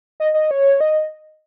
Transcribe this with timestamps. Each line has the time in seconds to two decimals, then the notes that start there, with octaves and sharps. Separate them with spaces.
0.20 D#5
0.34 D#5
0.51 C#5
0.81 D#5